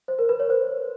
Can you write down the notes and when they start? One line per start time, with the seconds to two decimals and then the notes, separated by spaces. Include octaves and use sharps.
0.08 C5
0.19 A#4
0.29 B4
0.40 C#5
0.50 C5